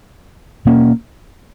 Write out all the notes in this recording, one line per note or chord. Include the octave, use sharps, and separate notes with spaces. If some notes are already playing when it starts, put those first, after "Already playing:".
B2 A#3 C#4